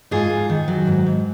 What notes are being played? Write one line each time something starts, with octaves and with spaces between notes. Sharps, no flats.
G#2 F4 G#4
G#2
D#3
F#3
G#2
G#2